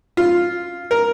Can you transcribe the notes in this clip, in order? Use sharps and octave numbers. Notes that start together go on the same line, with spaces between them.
F4
A#4